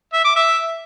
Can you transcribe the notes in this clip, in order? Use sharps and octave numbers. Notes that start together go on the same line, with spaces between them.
E5
D6
E5